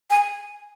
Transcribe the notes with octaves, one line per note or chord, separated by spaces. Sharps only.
G#5